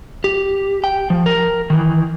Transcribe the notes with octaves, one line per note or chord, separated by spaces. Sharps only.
G4
G5
F3
A#4
D#3 E3